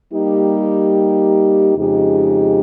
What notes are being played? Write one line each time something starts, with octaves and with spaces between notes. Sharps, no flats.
G3 A#3 D#4 G4
F2 C#3 G#3 D#4 G4